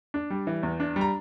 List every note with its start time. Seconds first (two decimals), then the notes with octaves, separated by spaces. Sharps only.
0.14 D4
0.30 G3
0.47 E3
0.63 E2
0.80 D4
0.96 G3
1.01 A#5